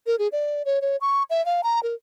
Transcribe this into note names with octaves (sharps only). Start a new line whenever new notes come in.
A#4
G#4
D5
C#5
C#5
C#6
E5
F5
A#5
A#4